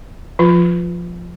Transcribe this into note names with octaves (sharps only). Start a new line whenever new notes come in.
F3 F4